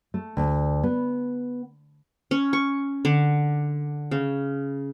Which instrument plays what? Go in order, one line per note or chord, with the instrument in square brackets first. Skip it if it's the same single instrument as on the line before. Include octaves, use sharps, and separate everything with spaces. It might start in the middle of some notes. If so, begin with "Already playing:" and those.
[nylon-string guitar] A3
D2
B3
[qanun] C#4
C#6
D3
C#3